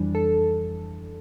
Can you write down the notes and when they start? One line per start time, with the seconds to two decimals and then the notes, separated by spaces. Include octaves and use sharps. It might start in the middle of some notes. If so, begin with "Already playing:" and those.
Already playing: F2 E3 G3 D4
0.15 A4